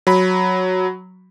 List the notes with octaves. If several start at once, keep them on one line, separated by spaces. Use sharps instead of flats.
F#3 B5